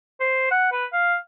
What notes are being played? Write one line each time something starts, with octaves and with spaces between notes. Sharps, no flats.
C5
F#5
B4
F5